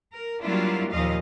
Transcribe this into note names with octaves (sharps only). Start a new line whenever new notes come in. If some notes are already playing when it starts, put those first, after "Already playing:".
A#4
F#3 G3 A#3 D4 E4 F4
D#2 A#2 F3 D#5 F5